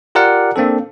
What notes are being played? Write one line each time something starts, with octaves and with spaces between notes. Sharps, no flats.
F4 G4 A#4 D5 F#5
A#3 C4 D4 A4